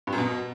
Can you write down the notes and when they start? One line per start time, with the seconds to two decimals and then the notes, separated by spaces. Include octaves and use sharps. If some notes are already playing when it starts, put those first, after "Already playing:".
0.07 G2
0.13 F#2
0.18 B2